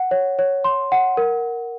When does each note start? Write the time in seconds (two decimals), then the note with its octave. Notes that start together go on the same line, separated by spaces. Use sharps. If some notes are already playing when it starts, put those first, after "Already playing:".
Already playing: F#5
0.11 C#5
0.39 C#5
0.64 C6
0.92 F#5
1.17 A#4